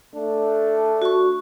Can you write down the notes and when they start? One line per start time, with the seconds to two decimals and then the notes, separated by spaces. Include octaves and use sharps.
0.14 A3 D4
1.02 F#4 C#6